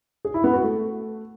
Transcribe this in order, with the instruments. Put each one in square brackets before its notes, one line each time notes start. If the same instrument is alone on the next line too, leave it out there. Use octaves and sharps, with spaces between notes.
[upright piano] G#4
E4
B3
F#4
A3